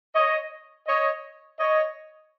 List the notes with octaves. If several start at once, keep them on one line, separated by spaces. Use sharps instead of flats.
C#5 D#5
C#5 D#5
C#5 D#5